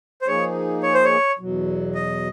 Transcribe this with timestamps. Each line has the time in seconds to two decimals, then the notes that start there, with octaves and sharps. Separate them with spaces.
0.22 C5
0.27 F3 A#3 D#4 G#4 C#5
0.83 C#5
0.94 C5
1.05 C#5
1.39 E2 B2 F#3
1.95 D#5